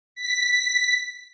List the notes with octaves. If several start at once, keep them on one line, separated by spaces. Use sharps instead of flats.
B6